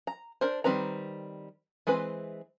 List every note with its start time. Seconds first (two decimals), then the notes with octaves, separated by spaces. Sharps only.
0.07 A#5
0.41 D4 A#4 C5
0.64 D#3 G3 C4 B4 A#5
1.87 E3 G#3 C4 B4